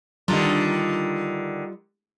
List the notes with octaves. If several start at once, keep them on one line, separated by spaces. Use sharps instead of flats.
D3 D#3 G3 F4 A#5